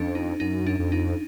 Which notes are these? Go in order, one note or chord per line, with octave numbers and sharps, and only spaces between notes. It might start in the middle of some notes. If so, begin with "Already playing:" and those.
Already playing: F2 C#4 D4
D#4
F#2 D#4
D4
F2
D#4